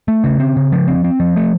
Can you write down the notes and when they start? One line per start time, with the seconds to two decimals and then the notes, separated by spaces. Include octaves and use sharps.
0.08 A3
0.24 C#3
0.40 C4
0.57 C#3
0.72 F3
0.88 C4
1.04 C4
1.20 F3
1.36 A3